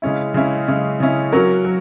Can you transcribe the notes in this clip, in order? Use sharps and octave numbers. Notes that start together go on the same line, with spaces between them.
C#3 G#3 C#4 E4
C#3 G#3 C#4 E4
C#3 G#3 C#4 E4
C#3 G#3 C#4 E4
F#3 C#4 F#4 A#4
F#3